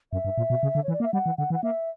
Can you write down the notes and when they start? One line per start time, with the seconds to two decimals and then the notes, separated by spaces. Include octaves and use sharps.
0.12 F#2 E5
0.25 G2
0.38 A#2
0.50 B2
0.63 C#3
0.75 D3
0.84 E3 C#5
0.93 D5
1.00 A#3
1.04 E5
1.13 G3 F#5
1.26 E3
1.38 D3 F#5
1.50 E3
1.54 F#5
1.63 A#3 E5